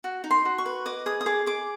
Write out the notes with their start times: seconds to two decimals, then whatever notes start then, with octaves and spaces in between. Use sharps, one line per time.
0.04 F#4
0.24 D#4
0.31 C6
0.45 F#4
0.58 C#6
0.66 B4
0.86 D#5 D6
1.06 G#4 D#6
1.21 D#6
1.26 G#4 D6
1.46 G#4 D6